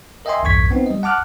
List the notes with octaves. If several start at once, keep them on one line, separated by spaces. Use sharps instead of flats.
A#4 D#5 E5 G5 G#5 C6
B1 E2 G2 C#6 G#6 B6
B3 C4 D#4
G3 D#5
F#5 A5 D6 F6 F#6